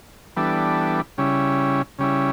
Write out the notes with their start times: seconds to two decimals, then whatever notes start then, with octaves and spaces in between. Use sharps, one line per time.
0.36 E3 G3 B3 D4 A4
1.18 C#3 G3 C#4 E4
1.98 C#3 G3 C#4 E4